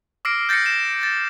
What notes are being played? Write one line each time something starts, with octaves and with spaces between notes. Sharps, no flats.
D6 E6 F6 A#6 C7 D7
G6 A6 A#6 C7 C#7
E7
A6 A#6